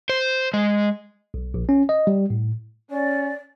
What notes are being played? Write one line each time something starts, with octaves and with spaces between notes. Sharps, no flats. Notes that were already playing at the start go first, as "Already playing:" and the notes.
C5
G#3
B1
A#1
C#4
D#5
G3
A2
C#4 D5